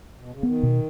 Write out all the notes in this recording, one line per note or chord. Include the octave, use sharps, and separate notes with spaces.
B2
C#3
D#3 B3
B2